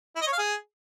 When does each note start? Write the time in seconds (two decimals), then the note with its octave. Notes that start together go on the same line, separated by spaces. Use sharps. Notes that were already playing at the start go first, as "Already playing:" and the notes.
0.15 E4
0.21 D#5
0.27 C#5
0.32 F5
0.38 G#4